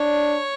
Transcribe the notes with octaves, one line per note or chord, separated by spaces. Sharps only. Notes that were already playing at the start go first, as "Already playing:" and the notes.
Already playing: D4 C#5